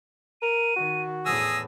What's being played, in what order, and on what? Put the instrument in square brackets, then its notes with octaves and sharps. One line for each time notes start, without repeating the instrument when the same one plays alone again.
[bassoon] A#4 [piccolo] D#7
[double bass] D#3 [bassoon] F#4
[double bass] E2 A2 [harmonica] G#4 D#6 E6 [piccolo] A#6